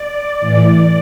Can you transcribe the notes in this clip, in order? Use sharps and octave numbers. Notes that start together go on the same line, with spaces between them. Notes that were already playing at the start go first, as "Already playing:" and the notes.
Already playing: D5
A2 E3